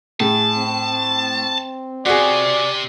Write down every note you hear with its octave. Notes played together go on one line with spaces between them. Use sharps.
A2 G#4 A5
C4
C3 F#4 G#4 D5